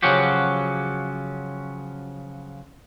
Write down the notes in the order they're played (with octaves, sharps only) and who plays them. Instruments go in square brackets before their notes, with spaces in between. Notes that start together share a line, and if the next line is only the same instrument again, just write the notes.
[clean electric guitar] C#3 F3 F#3 C#4 F#4 G4